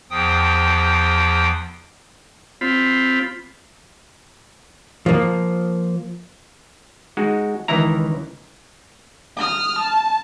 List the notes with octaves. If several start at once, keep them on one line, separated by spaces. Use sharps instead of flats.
E2 F3 G5 D#6
C4 F4 B5
F3 A#3
G#3 D#4 F#4
C#2 D#3 E3 E4 A#5
D#6 F6
A5